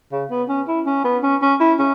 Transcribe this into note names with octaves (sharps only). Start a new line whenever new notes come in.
C#3
B3
C#4
E4
C#4
B3
C#4
C#4
E4
C#4